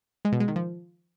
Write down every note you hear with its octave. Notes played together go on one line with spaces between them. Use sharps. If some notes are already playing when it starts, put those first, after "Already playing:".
G#3
B2
G#3
D#3
F3